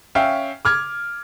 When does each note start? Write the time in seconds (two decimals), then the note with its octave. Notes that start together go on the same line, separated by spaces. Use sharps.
0.15 C#4 E5 F5 G5
0.65 D6 F6 G#6